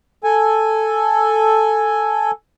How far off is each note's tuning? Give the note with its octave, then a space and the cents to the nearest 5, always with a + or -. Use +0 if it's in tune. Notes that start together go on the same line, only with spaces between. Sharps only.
A4 +0 G#5 +0